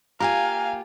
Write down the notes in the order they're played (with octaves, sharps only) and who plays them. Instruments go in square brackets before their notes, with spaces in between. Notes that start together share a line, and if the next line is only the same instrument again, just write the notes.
[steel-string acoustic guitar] A#3 F4 G4 [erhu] F5 [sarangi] G#5 [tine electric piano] A#5